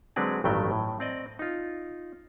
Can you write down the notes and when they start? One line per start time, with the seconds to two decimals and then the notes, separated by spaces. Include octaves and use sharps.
0.16 D3 F#3 G#3 C4 B4 D5
0.44 A1 G2 D#3 F#3 A3 G5
0.71 A2
1.00 C4 D5 D#5
1.39 D#4 F4